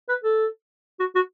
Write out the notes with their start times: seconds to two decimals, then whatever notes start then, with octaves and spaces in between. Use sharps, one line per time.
0.09 B4
0.23 A4
1.00 F#4
1.15 F#4